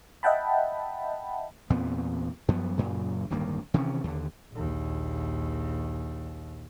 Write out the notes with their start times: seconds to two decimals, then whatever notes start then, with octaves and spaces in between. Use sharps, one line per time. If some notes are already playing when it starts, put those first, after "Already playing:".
0.23 D#5 E5 F#5 G5 A5 B5
1.70 E2 A#2 B3 C4
2.48 F#2 F3 B3
2.77 F#2 A#2 C#3
3.30 D1 G2 D#3 A#3
3.74 C3 D#3 E3 C#4
4.04 D#2 D3
4.52 A#1 D#2